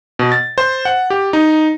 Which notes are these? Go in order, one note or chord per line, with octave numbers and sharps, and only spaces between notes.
B2
A6
C5
F#5
G4
D#4